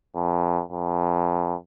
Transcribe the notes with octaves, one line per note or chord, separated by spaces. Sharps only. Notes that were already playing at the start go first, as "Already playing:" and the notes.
F2
F2